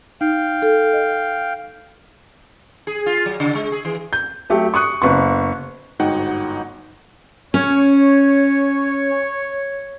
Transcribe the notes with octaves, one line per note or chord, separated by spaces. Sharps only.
D#4 F5 G5
A4
D#5
G#4
F4
F#3
C#3
G#3
G#4
E3
G6
F#3 A3 G4
C#6 D#6 F#6 C#7
F#1 B3 C#6
G1 G#2 D#4 F#4 F#5 G5
C#4 C#5